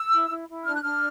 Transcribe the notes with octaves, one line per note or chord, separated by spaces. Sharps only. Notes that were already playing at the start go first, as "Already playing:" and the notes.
Already playing: E6
E4
E4
E4
D4 F6
F#6
D4 F6